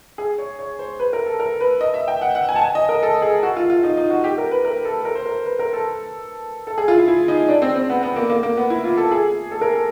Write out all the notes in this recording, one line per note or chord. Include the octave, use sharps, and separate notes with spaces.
G#4
C#5
C#5
C5
B4
A#4
A4
A#4
B4
D#5
E5
G5
F#5
F#5
G#5
A5
G#5
D#5
A#4
A4
G#4
F#4
F4
F4
D#4
D#4
F#4
G4
A#4
B4
A#4
A4
A#4
C5
A#4
B4
A#4
A4
A4
G#4
F4
E4
E4
D#4
D4
C4
C4
B3
B3
A#3
A#3
A#3
B3
E4
F4
A4
G#4
A4
A#4
A4